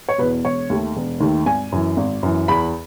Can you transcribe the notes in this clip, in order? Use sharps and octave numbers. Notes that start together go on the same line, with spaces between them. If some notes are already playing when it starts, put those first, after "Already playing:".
C#5
E2 B2 B4
E1 C#5
D#2 D#3 A3
E1
D#2 D#3 A3
G#1 G#5
F#2 E3
G#1
F#2 E3
E2 B5